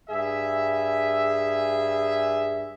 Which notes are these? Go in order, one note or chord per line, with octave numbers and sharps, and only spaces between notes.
G2 G#4 E5